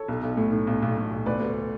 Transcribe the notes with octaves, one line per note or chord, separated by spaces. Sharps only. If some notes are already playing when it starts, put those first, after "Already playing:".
Already playing: A4 C#5
B1
B1
A2
A2
B1
B1
B1
B1
D2 B4 D5
D2